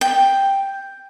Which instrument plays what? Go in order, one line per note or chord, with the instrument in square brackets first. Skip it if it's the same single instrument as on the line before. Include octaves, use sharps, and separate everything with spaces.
[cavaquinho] G5